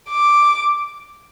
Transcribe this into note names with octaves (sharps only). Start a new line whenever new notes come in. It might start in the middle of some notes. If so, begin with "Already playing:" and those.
D6